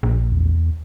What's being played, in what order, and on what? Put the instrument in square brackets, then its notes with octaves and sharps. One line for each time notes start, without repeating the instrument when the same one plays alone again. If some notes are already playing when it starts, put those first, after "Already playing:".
[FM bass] A#1
[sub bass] E2